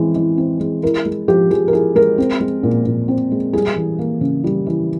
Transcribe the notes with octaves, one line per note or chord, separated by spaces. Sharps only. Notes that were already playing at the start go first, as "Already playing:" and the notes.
Already playing: E3 G#3 C4
E3
C4
G#3
E4 A#4
G#3
F3 G4
F3 G#4
A#4
E4 G#4
G#3 A#4
C4
G#3
A#2
A#2
C4
G#3
G3 G#4
E3
A#3
C#3
G3
E3